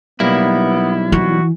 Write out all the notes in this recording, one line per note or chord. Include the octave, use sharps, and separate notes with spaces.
B1 G3 A#3 B3 E4
E3 F#4